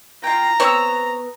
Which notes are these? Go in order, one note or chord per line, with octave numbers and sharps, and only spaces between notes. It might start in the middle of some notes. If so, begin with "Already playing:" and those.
F4 G5 A#5
B3 C4 C#5 B5 E6